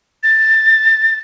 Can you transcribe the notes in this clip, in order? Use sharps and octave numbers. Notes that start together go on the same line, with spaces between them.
A6